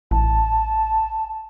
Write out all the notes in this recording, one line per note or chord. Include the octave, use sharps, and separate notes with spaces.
A1 A5